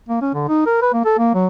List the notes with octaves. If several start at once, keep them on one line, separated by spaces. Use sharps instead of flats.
A#3
C#4
D3
D#4
A#4
B4
A#3
A4
A#3
F#3